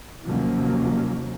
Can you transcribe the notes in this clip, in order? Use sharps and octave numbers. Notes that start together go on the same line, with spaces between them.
D#2 C3 F3 F#3 A#3 C#4